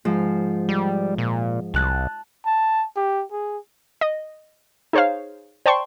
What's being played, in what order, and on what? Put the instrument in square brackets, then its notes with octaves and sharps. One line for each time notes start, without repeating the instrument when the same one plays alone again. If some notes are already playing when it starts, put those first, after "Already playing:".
[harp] G#2 F3
[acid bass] G3
A#2
[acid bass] C2 [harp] A5 F#6
[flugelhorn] A5
G4
G#4
[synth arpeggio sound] D#5
D#4 G#4 C5 C#5 F5
C5 D5 G5 A5 C6 C#6